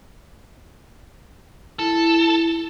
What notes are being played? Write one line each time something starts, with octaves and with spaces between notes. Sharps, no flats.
E4 A4